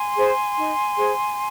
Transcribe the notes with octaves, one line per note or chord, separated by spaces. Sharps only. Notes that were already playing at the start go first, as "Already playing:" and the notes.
Already playing: G#5 C6
G#4 C5
D#4
G#4 C5